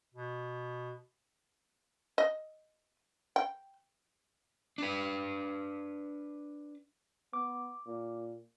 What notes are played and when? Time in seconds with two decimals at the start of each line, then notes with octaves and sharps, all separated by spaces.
0.14 B2
2.18 D#5
3.36 G5
4.78 D4 B4
7.33 B3 D6
7.86 A#2